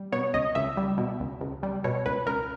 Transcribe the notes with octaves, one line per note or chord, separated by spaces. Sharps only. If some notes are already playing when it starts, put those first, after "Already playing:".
Already playing: G3
B2 C#5
C#2 D#5
C#2 E5
G3
B2
C#2
C#2
G3
B2 C#5
C#2 B4
C#2 A#4